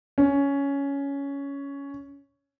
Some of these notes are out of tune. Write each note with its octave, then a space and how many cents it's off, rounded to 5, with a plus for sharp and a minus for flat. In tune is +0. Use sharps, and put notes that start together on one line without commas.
C#4 +10